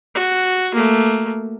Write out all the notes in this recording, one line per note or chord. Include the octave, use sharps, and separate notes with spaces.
F#4
A3 A#3